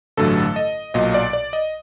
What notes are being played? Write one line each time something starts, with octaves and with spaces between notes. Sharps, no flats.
A1 G2 D3 F#3 A3 A4
D#5
B1 A#2 F#3 D#5
D5
D5
D#5